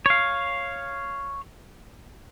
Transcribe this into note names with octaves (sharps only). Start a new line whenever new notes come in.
C#5 F5